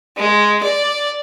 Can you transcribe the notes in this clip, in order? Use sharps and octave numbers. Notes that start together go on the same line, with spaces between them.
G#3
D5